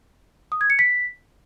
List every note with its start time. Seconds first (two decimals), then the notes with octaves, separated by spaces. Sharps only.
0.52 D#6
0.61 G#6
0.70 C#7
0.79 B6